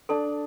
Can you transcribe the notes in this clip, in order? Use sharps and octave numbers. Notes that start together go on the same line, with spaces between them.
D4 A4